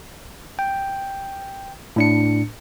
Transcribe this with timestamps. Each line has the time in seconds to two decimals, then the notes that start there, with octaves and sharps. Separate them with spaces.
0.59 G5
1.96 A2 D4 C#7